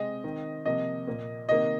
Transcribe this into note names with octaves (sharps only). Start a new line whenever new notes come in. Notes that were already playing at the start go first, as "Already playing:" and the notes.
Already playing: C3 G#3 C4 D#5
D#3 C4
C3 F3 A#3 D#5
A#2 A#3
C3 D#3 A#3 D#5